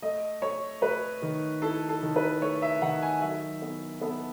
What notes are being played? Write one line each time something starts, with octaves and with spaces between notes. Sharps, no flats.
A3 D#5
A3 C#5
A3 B4
D#3
E4 A4
A4
D#3
B4
A3 C#5
E5
D#3 F#5
G#5
F#3 E5
B3
B3 A4